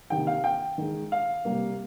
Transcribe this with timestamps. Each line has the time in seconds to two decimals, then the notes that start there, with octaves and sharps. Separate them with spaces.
0.10 C3 D#3 A#3 G5
0.27 F5
0.44 G5
0.78 D#3 G#3
1.12 F5
1.45 C3 G3 A#3